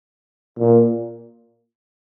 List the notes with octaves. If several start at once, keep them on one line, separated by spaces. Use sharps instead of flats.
A#2